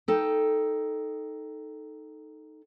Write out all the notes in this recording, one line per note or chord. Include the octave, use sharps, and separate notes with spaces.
D#4 A4 G5